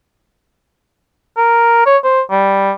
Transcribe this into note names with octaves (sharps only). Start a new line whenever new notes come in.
A#4
C#5
C5
G3